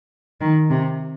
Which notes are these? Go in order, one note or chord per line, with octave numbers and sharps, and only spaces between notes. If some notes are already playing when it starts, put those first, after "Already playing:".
D#3
C3